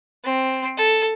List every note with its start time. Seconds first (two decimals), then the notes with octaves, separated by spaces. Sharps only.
0.24 C4
0.77 A4